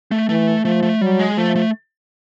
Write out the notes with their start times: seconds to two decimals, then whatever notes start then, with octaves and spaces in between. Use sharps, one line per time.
0.11 A3
0.29 E3 A3
0.64 F3 A3
0.82 A3
1.01 F#3 G3
1.19 G#3
1.37 F3 A3
1.55 A3